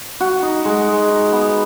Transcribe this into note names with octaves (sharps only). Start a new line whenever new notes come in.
F#4
D#4
G#3
G#3
D#4
B3